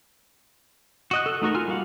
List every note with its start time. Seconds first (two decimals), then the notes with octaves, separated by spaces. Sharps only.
1.11 F#4 D#5 F#6
1.26 A4
1.42 A3 D#4 F#4 A#4
1.54 F4 G#5 F6
1.68 G3 A#3 F5 F#5